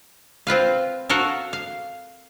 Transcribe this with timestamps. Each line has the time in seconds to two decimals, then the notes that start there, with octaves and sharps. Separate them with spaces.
0.47 C4 F4 B4 F5
1.09 F#4 A4 A#4 F5
1.53 F5